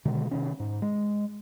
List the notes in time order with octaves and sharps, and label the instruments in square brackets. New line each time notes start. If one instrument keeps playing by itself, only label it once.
[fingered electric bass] B2 D3 D#3 G#3
C3 D#3 C#4
G#2
G#3